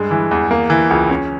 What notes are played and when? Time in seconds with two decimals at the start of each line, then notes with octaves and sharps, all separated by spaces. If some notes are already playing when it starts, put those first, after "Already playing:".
Already playing: G2 G#3
0.11 E3
0.31 E2
0.51 A#3
0.70 E3
0.90 C#2
1.10 C#4